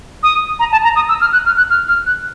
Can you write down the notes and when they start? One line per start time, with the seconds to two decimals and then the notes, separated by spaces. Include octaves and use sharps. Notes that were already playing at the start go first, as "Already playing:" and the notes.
0.23 D#6
0.59 A#5
0.72 A5
0.84 A#5
0.96 D#6
1.09 E6
1.21 F6
1.33 F#6
1.46 F6
1.57 F#6
1.70 F6
1.88 F6
2.06 F#6